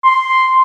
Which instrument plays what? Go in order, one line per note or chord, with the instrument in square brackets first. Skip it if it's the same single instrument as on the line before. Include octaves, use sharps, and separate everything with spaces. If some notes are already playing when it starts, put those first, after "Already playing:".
[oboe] C6